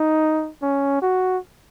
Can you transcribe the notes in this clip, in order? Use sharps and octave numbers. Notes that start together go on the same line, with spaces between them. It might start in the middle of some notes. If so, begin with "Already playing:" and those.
Already playing: D#4
C#4
F#4